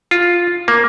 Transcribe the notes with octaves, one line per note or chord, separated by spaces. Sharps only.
F4
A#3